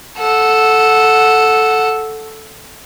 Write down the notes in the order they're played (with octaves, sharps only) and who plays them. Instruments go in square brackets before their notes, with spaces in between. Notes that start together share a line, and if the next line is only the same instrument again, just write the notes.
[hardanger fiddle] A4 F#5